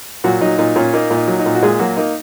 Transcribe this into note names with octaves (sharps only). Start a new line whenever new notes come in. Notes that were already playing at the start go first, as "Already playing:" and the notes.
A#2 F#3 F#4
F#3 D#4
A#2 D#4
A#2 C#4
A#3 D#4
A#2
D#4
F#3
D#4
A#2
F#4
A#2 G#3 G#4
F#3 A#3 F#4
A#3 D#4